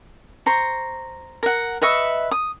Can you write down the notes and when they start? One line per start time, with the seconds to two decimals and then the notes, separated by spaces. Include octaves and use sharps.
0.46 C5 A#5 C#6
1.43 A#4 F#5
1.82 B4 D#5 E5 C#6
2.31 D#6